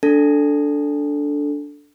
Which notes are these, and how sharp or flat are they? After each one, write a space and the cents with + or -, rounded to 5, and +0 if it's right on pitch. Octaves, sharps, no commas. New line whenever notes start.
D4 -10 A4 +0